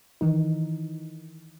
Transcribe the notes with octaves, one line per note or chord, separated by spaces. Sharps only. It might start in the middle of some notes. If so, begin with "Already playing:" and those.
D#3 E3 D#4